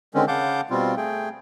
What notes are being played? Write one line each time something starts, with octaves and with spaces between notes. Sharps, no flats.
D3 D#3 G#3 C4 C#4
C#3 F5 F#5 A5 D6 G6
B2 G3 C4 F4
A3 G#4 G5